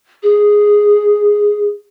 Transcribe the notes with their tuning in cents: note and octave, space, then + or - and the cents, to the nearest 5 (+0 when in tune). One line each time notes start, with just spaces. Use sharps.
G#4 -5